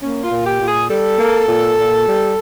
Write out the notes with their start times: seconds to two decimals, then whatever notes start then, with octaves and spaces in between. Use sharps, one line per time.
0.02 A#3 C#4
0.23 F4
0.30 A#2
0.45 G4
0.60 A#2
0.67 G#4
0.89 G3 A4
1.18 A#3
1.47 A#2
1.77 A#2
2.06 G3